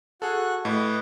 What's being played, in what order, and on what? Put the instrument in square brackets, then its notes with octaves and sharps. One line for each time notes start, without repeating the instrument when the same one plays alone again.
[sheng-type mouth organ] F#4 C#6 F#6 [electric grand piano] G#4 A4
[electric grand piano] A2 [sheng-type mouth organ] B4 D#5 D6